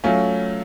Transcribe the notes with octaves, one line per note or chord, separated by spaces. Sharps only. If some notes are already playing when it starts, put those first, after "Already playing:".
F#3 A3 C#4 F4